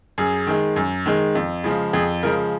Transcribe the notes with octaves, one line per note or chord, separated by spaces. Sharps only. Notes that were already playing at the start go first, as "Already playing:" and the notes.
F#2 G#4
D#3 G#3
F#2
D#3 G#3
F2
C#3 F3 G#3
F2 G#4
C#3 F3 G#3 A#4